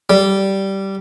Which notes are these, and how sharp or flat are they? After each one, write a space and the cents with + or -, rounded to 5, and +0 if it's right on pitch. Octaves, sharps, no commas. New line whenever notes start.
G3 -10